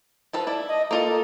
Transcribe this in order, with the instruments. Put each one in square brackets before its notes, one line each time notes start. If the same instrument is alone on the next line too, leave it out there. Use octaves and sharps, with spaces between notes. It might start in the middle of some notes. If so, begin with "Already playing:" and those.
[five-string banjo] F3 A4 B4
E4 D5
[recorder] D#5
[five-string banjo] A#3 F4 D#5 [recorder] A4